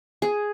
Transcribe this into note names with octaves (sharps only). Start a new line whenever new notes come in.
G#4